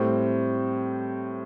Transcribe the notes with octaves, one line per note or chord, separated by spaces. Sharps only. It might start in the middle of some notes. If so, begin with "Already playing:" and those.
Already playing: A2 G3 C4